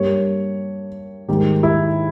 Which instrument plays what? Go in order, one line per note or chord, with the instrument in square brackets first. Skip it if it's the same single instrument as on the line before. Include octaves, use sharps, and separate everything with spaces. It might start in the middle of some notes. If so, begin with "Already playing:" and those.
Already playing: [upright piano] G2 G3 A#3 C#5
G#2 D#3 G3 A#3 G4
E4